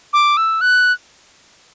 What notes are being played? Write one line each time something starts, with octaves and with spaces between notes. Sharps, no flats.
D6
E6
F#6